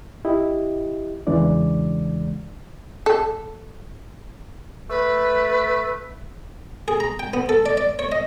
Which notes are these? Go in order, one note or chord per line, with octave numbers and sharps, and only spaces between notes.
E4 G4 D#5
E2 C#3 E3 G#3 D4 D5
A4
A3 B4
G#4
A#5
G5
B3
A4
D5
D5
C#5
D#5